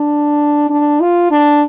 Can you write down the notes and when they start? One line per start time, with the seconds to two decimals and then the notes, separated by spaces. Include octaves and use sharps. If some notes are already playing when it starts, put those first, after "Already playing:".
Already playing: D4
0.70 D4
1.01 F4
1.31 D4